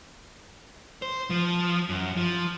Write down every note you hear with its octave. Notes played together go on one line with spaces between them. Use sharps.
C5
F3
F#2
F3